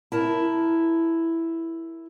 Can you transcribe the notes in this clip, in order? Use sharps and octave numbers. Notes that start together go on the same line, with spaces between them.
E4 A#4 A5